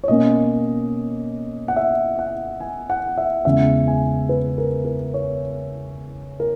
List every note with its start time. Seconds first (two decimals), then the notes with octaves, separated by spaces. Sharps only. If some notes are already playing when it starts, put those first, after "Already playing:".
0.04 C#5
0.08 B2 A#3 C#4 D#5
1.68 F#5
1.77 E5
2.19 F#5
2.60 G#5
2.90 F#5
3.18 E5
3.45 E2 C#3 G#3 C#4 E5
3.87 G#5
4.29 B4
4.58 A#4
4.85 A#4
5.14 C#5
6.40 A#4